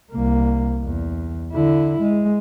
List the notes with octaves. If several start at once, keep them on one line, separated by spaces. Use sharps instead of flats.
C2 A#3
E2
D3 E4
G#3